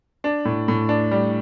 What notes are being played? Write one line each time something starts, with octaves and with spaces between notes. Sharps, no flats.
D4
A2
A2
D4
G3